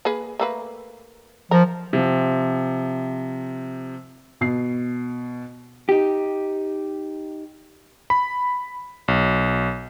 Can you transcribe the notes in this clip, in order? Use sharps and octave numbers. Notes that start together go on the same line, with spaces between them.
A#3 G#4 B4
A3 A#3 B4
F3 A#4
C3 F3
B2 C7
D#4 G4
B5
B1